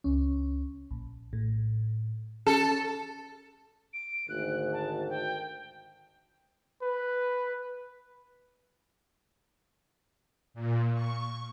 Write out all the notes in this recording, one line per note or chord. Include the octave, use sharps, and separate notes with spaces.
C#2 C#4
A#1
A2
C#4 A4
D7
G#1 D2 G#2 F#6
A5
G5
B4
A#2
C#6